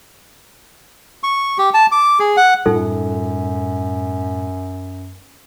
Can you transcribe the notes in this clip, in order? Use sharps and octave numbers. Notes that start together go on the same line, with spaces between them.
C#6
G4
A5
D6
G#4
F#5
F#2 A2 G3 D#4 F4 A4